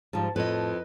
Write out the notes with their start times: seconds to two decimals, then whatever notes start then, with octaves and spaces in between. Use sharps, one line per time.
0.13 G#2 F3 G3 A5
0.36 F2 A2 B4 D#5